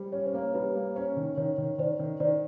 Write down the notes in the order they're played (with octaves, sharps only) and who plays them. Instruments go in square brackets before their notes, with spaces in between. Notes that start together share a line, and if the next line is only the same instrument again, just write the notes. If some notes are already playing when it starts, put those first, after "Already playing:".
Already playing: [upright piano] G3 [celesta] C5
[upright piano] C#4 [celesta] C#5
[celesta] C5
[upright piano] A#3 [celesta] C#5
[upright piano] G3 [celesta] B4
[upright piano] A#3
[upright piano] C#4 [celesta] C5
[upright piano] D#3
[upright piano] D#3 [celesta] C#5
[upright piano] D#3
[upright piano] D#3 [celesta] C5 D5
[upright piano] D#3
[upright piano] D#3 [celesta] C5 D5